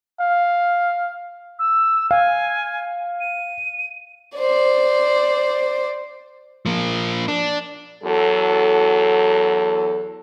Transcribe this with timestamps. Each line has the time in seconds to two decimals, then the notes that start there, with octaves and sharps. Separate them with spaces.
0.20 F5
1.59 E6
2.11 F5 G#5
3.20 D#7
4.38 C5 D5
6.66 F3 A#3
7.28 D4
8.04 E2 F#3 A4